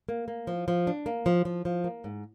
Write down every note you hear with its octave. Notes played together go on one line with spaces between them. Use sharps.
A#3
A#3
F3
F3
D4
A#3
F3
F3
F3
A#3
G#2